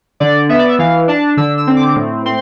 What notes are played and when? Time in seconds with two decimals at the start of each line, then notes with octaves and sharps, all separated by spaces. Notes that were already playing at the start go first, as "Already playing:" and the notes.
0.20 D3 D5
0.49 B3 E5
0.59 D5
0.69 E5
0.79 E3 F5
1.08 D4 A5
1.37 D3 E6
1.58 E6
1.67 C4
1.77 D6
1.96 A2
2.26 C4 C6